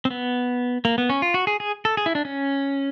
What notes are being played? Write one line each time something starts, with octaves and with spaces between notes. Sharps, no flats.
C4
B3
A#3
B3
C#4
F4
F#4
G#4
G#4
A4
G#4
E4
D4
C#4